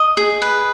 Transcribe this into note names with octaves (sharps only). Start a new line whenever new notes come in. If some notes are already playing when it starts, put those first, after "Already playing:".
Already playing: D#5
G#4
B4